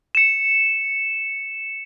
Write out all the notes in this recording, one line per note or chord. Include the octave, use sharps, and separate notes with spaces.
C#7 E7